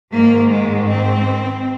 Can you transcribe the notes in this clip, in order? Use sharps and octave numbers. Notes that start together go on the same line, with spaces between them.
G#2 D#3 A#3
G#3
C4